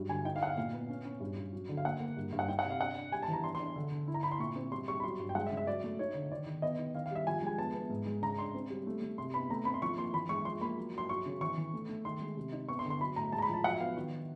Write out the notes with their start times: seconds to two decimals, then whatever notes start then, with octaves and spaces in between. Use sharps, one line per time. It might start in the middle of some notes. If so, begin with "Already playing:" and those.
Already playing: G2 F#3
0.09 D3 G#5
0.25 D#4 G5
0.36 F5
0.41 D#4 F#5
0.47 F5
0.57 A#2 F5
0.73 B3
0.89 C#4
1.05 C#4
1.20 G2
1.36 G2
1.52 F#3
1.69 D3
1.77 F5
1.85 A#3 F#5
2.00 A#3
2.17 G2
2.33 G2
2.39 F#5
2.48 D#4 G5
2.59 F#5
2.65 C3
2.70 F5
2.80 D4 F#5
2.96 D4
3.12 G3 G#5
3.23 A5
3.28 E3 A#5
3.44 D4 C6
3.55 C6
3.60 D4
3.76 D3
3.92 D3
4.08 E4
4.14 A#5
4.23 E4 B5
4.31 C6
4.40 A#2 C#6
4.56 C4
4.71 G3 C6
4.88 G3 C#6
5.00 B5
5.04 F#3 C6
5.20 G2
5.29 G5
5.35 G#3 F#5
5.46 E5
5.51 C#3
5.57 E5
5.67 F#3 D5
5.84 A3
5.99 D#4 C#5
6.15 D3
6.32 D#3 D5
6.46 D#3
6.62 B3 D#5
6.79 D#3
6.95 D#3 F5
7.06 F5
7.11 G3 E5
7.27 F3 G#5
7.42 G#3 G#5
7.58 B3 A5
7.74 B3
7.90 G#2
8.06 G#3
8.22 C#3 A#5
8.39 D4 C6
8.55 C4
8.70 G3
8.87 A3
9.02 A3
9.18 C3 C6
9.34 B3 B5
9.50 A3 A#5
9.65 C4 B5
9.74 C6
9.82 F3 C#6
9.98 A#3 C6
10.13 E3 B5
10.29 G#3 C#6
10.45 F3 C6
10.61 A#3 B5
10.77 F#3
10.93 F#3 C6
11.09 F#3 C#6
11.26 C#3
11.41 E3 C#6
11.58 E3
11.74 A3
11.89 A3
12.05 D#3 C6
12.21 G#3
12.37 C3
12.52 D#4
12.69 B3 C#6
12.79 C6
12.85 D3
12.90 C6
13.00 F#3 B5
13.16 A2 A#5
13.32 G#3 A5
13.38 A#5
13.42 B5
13.49 F3 A5
13.64 F#3 F#5
13.74 E5
13.80 B3 F5
13.97 D#3